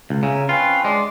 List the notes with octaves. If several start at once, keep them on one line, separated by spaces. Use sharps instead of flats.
C#2
C#3 E5 G#5 A#5
C4 C#4 F4 B4
G#3 D4 D5 C6